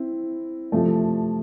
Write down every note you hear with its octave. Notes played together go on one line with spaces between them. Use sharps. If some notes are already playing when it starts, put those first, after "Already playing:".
Already playing: C4 E4
C3 F3 A3